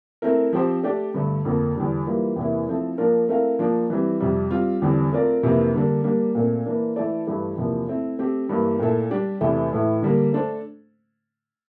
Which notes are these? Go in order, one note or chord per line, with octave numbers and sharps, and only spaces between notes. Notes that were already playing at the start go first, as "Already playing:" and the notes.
A3 C4 E4 A#4
F3 C4 G4 C5
A3 D4 G4 D5
G2 D3 A3
F2 D3 F3 A#3
E2 D3 G3
E3 G3 A#3 F4
E2 C3 E3 A#3 E4
F3 A3 C4 E4 A4
F3 A#3 D4 F4 A#4
A3 C4 E4 A#4 F5
F3 A#3 D4 F4
E3 G3 C4
F2 C3 G3
G3 C4 F4
E2 D3 G3 C4
A3 C4 F4 A#4 D5
F2 C3 E3 A#3
D3 G3 A#3 D4
G3 A#3 D4
A#2 A3 C4
E3 A#3 D4
E3 A3 E4 A4 D5
G2 E3 A3 E4 G4
E2 C3 F3 A#3
A3 C4 E4
A3 C4 G4
G2 E3 G3 A#3
A#2 A3 E4 A4 E5
G3 D4 G4
E2 C3 E3 A3 E4
A2 E3 A3 E4
D3 G3 A#3
A3 D4 A4 C5